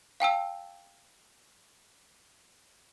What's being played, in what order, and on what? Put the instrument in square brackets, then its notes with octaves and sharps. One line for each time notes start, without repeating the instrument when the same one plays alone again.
[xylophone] F5 G5 A5 E6